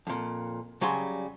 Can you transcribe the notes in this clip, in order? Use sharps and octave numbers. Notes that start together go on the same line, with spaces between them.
F2 A#2
C#3 F#3 G3 G#5 C6